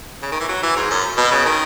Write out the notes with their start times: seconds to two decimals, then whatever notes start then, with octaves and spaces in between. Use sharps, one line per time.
0.23 C#3
0.32 D#3
0.40 E3
0.49 F#3
0.63 E3
0.76 G#2
0.91 F#2
1.18 B2
1.31 C#3
1.46 D#3